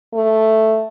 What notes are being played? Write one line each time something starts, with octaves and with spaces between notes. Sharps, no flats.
A3